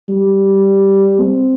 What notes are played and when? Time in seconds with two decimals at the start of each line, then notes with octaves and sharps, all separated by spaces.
0.09 G3
1.20 C4